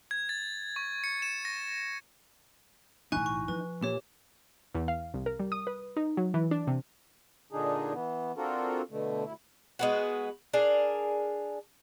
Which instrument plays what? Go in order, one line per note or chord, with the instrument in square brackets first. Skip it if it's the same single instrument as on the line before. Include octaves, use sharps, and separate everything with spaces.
[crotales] G#6
A6
C#6
C#7
E7
A#6
[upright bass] B1 A2 [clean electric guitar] E3 D#4 [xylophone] G#5 C#6 F#6
[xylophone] C#6
[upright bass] F3 [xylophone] B4
[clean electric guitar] A#2 [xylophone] G4 C#5
[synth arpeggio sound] E2
F5
C2
A#4
G3
D#6
B4
D#4
F#3
E3
D4
C3
[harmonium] A#2 D3 D4 D#4 G#4
E3 B3
C4 D4 F4 F#4 A4 A#4
B2 D3 A3
D2 E4
[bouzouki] G#3 B3 F#4
D4 G#4 A#4